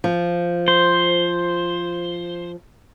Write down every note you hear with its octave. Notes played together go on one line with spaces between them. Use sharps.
F3
C5